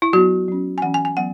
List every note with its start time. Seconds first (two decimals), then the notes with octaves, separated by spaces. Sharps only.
0.02 E4
0.13 F#3 B3 F#4
0.48 F#3 C#4
0.78 G#5
0.82 E3 C#4 F#5
0.94 G#5
1.05 G#5
1.17 F#3 B3 F#5